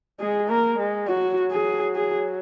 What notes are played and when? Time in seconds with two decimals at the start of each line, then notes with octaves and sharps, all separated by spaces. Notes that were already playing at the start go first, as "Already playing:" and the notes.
0.20 G#3 G#4
0.49 A#3 A#4
0.79 G#3
1.08 F#3 F#4
1.51 G#4
1.95 G#4